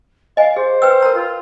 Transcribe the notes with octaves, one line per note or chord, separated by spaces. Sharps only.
D#5 F5 G#5
G#4 C5
B4 G5 E6
A#4 A#5
F4